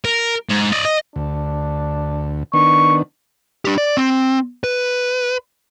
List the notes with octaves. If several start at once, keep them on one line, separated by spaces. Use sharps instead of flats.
A#4
G#2
D5 D#5
D#5
D2 D4
D#3 B3 D4 C#6
D4 G4
D5
C4
B4